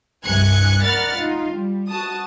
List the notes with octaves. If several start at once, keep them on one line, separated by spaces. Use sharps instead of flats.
C2 G2 G#5 F#6 G#6 C#7
A#4 D5 F#5 B5 F6 A6
D#4 F4
G3
F#4 A5 D#6